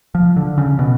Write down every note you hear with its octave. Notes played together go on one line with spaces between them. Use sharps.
F3
D3
C#3
B2